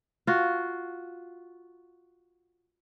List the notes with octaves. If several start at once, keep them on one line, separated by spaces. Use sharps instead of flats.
F4 F#4